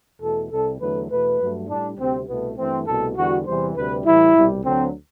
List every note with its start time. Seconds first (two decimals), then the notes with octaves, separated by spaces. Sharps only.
0.21 E2 B2 A3 A4
0.51 C2 C3 G3 A4
0.81 E2 D3 F#3 A3 B4
1.11 E2 B2 A3 B4
1.40 G2 F#3 A3
1.69 A2 G3 D4
1.98 D2 C3 G3 C4
2.28 C2 B2 A3 B3
2.58 G2 E3 A3 C4
2.87 C2 B2 A3 A4
3.17 E2 D3 G3 F#4
3.46 E2 C3 E3 G3 C5
3.76 D2 C3 G3 B4
4.06 A2 E3 G3 E4
4.35 C2 B2 G3
4.64 D2 D3 F#3 C4